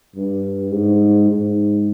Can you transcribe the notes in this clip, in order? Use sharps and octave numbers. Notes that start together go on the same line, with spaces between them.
G2
G#2
G#2